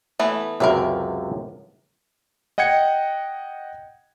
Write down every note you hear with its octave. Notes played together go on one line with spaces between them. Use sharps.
E3 A3 B3
C#2 F#2 C3 A#4 B4 E5
D#5 F#5 G5 G#6 C#7